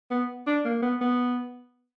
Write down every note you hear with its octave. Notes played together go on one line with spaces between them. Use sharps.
B3
D4
A#3
B3
B3